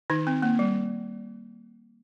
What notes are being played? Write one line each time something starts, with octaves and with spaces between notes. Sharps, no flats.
D#3 D#4
C4
A#3
G3